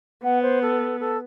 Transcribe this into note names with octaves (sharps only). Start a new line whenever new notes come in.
B3 F#5
C5
A4
A4